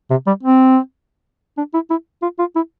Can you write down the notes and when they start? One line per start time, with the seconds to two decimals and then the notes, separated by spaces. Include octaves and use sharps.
0.10 C3
0.27 G3
0.43 C4
1.58 D4
1.74 E4
1.90 E4
2.22 F4
2.39 F4
2.56 E4